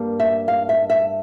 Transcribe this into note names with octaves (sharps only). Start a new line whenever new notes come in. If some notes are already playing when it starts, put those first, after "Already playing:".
Already playing: G2 G3 A#3
E5
F5
E5
E5